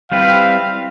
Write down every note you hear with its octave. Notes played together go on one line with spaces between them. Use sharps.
G3 C4 E4 B4 F5